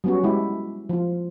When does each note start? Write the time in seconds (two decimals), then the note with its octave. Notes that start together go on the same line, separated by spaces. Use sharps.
0.04 F#3 G3 B3 C#4 F#4
0.24 G#3 E4 G4
0.89 F3 F4